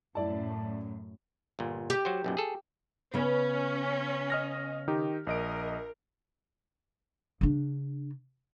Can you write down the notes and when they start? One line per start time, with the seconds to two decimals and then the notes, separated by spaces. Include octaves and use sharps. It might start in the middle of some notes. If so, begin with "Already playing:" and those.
0.15 F#2 A2 E4 D5 A5
1.59 G1 A#2
1.90 G4
2.05 F#3 F#4 C5
2.24 B1 F#2 A#2
2.37 G#4 A4
3.14 C#3 B3 C#4
4.30 D#5 F6 A#6
4.88 D#3 D#4 G4
5.27 A#1 A#4 D#5 D7
7.41 C#3 D4